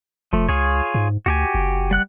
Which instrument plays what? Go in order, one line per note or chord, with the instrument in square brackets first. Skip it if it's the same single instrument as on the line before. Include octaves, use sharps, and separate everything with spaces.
[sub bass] F1 [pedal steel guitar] F3 A3
[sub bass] C#2 [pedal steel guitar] F4 G#4 C#5
[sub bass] G#2
[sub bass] D2 [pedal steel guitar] F#4 G4 G#5
[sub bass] F#1
[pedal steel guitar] G3 F#5 F#6